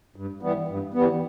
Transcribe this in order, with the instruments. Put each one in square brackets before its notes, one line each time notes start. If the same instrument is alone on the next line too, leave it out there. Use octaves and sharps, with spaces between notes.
[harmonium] G2
E3 G3 B3
G2
E3 G3 B3